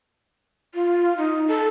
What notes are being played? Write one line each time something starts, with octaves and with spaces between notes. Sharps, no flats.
F4
D#4
A4